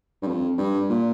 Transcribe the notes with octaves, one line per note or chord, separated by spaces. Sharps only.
G2
F2
G2
A#2